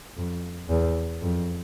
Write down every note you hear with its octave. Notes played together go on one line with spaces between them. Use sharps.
F2
E2
F2